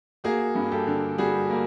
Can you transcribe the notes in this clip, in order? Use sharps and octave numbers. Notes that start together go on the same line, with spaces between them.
A#3 F#4 G#4
G2
G4 A4
D3
G3 F#4 G#4
A#3